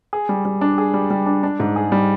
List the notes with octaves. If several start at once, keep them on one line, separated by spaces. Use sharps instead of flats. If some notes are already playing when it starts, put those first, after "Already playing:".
G#4
G3
G3
D4
G#4
G3
G3
D4
D4
G#2
G#4
G3